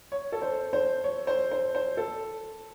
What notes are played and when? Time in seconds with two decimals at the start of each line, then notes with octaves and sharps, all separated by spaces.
0.12 C#5
0.32 A4
0.42 C5
0.73 C5
1.04 C#5
1.27 C5
1.51 C5
1.75 C5
1.97 A4